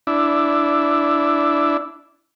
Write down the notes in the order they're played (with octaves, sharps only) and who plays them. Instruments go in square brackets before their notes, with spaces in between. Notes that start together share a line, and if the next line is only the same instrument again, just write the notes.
[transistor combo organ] D4 E4